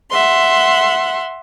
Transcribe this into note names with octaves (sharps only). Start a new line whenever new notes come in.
E5 F#5 C6